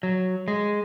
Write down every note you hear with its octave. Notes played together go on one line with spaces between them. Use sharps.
F#3
G#3